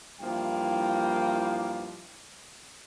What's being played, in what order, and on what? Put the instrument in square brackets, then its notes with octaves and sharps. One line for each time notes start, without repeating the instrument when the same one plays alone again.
[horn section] G2 E3 F3 A#3 E4 G5